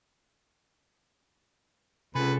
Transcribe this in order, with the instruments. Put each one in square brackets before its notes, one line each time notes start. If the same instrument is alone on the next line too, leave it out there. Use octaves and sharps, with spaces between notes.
[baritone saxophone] C#2 [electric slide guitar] C3 G#4 A4 [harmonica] B4